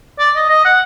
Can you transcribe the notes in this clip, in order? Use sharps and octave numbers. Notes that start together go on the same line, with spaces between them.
D5
D#5
D#5
F#5